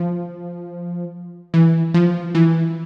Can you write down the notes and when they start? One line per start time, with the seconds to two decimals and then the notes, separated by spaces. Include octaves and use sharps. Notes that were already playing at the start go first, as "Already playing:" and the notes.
Already playing: F3
1.54 E3
1.94 F3
2.35 E3